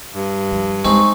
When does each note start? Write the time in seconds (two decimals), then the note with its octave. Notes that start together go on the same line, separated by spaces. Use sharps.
0.14 G2
0.52 F3
0.85 G#3 C4 D#4 G#4 C#6